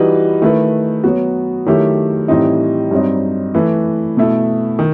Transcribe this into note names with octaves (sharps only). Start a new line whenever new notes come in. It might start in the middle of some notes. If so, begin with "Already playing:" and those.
Already playing: E3 G3 D#4 F#4 B4
D#3 A3 E4 B4
F#3 B3 F#4
D#3 F#3 A3 E4 G4
A2 E3 G3 C4 D#4
G2 F#3 C4 D#4
E3 A3 E4 B4
B2 A3 E4
D#3